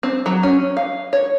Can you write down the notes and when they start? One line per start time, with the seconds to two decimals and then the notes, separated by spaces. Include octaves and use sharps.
0.03 C4
0.26 F#3
0.43 C#4
0.77 F5
1.13 C#5